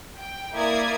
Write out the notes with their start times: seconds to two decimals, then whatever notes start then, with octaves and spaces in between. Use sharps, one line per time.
0.18 G5
0.53 A#3 E4 A#4 D5 D#6 G#6